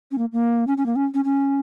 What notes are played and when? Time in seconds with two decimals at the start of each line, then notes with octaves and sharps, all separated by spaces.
0.12 C#4
0.18 A#3
0.33 A#3
0.67 C#4
0.77 C#4
0.86 A#3
0.96 C#4
1.14 C#4
1.24 C#4